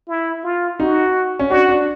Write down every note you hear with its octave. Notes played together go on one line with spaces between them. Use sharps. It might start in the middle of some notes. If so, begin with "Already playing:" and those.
E4
F4
D#4 F#4
C#4
D4 F#4
D4